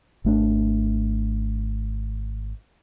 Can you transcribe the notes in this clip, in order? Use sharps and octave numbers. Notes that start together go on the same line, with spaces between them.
G#1 A3 D4